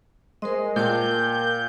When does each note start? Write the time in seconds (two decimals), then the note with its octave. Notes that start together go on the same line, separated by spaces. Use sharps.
0.42 G#3 A#4 C5 D#5
0.76 A#2 A#4 G5 A5 G6